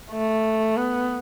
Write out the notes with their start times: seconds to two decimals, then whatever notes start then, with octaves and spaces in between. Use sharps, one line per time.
0.11 A3
0.77 B3